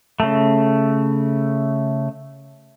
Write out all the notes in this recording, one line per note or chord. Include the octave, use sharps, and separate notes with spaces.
C#3 A3